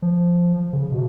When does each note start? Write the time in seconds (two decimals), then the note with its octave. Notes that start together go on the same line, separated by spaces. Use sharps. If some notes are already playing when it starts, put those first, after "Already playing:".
0.02 F3
0.73 C#3
0.92 B2